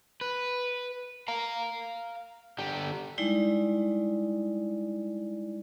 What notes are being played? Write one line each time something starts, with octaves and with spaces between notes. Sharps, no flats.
B4
F5 A#5
D3 G4
G3 G#3 D#4 E4 D5